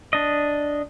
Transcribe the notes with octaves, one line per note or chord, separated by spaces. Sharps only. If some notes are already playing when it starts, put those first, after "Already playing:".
D4 D#5